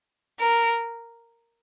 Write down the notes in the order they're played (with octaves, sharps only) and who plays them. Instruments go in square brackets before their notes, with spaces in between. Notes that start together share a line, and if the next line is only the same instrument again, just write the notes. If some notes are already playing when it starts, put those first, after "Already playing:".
[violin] A#4